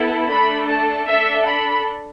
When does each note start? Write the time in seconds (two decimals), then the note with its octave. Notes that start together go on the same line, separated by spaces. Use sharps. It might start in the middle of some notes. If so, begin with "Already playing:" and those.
Already playing: B3 E4 A4
0.30 A3 D4 A4 B5
0.69 A5
1.09 D4 A4 E5
1.47 B5